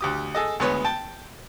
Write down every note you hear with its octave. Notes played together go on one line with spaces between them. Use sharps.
D2 G4 D#6
G#4 A4 D#5
D2 G#3 B3 B4 C#5
G5 A5